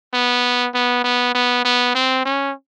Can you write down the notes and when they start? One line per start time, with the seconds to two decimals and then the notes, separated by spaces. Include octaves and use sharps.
0.13 B3
0.74 B3
1.04 B3
1.35 B3
1.65 B3
1.95 C4
2.25 C#4